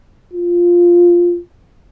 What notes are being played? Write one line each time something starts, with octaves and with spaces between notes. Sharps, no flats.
F4